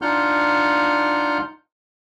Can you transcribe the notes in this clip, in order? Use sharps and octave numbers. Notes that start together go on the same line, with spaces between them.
D4 D#4 F4 F#5 F6 G6